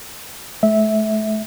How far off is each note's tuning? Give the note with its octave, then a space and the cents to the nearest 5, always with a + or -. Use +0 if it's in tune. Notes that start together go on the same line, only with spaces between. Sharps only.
A3 -40 E5 -15